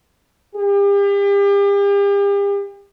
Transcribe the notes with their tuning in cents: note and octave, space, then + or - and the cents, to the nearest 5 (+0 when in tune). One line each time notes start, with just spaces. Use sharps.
G4 +40